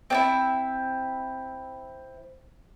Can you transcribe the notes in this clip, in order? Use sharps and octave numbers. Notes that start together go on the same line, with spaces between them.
C4 D4 E4